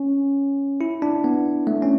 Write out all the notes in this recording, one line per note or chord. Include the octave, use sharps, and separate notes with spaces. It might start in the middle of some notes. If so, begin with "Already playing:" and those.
Already playing: C#4
E4
D4
B3
A3
C#4